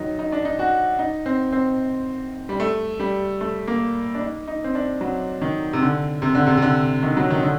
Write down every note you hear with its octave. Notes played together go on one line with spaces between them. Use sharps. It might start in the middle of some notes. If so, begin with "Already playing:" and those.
Already playing: D#3 F#3 D#4
D#4
D4
D#4
F#4
D#4
C4
C4
G3
A3
G3
A3
A#3
D4
D#4
D#4
C4
D4
F#3
D#3
C3
D3
C3
D3
C3
C3
D3
D#3
F#3
D#3
D3